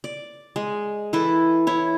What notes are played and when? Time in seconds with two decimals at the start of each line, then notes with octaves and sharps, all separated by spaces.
0.04 D5
0.56 G#3
1.13 E3 E4 A4 B4
1.67 E4 C#5